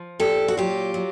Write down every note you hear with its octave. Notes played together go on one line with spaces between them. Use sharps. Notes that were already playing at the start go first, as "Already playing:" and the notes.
Already playing: F3
A#2 G4 A4
F#4
F#3 F4 G4
F#3